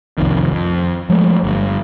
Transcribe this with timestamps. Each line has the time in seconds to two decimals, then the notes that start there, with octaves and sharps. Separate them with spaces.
0.18 C2 F2 D#3
0.53 F2
1.10 F3 G#3 A3
1.43 G1 G2